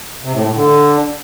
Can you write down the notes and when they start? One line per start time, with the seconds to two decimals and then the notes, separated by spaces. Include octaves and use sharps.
0.23 C3
0.34 A2
0.45 A2
0.56 D3